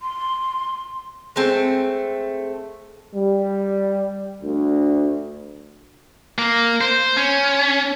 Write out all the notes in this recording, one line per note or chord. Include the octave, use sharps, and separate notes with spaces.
C6
G#3 A3 C4
G3
D2
A#3
C5
C#4